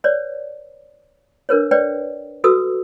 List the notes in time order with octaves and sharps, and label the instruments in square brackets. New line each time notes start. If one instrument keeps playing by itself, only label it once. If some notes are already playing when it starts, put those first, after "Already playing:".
[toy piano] B4 C#5 D5
D4 A#4 B4 C#5
B4 C#5 D5 G5
F#4 A4 B4 D#6 E6